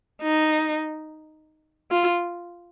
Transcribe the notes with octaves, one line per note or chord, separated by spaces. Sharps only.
D#4
F4